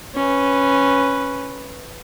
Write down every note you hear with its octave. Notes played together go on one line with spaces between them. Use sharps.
C#4 B4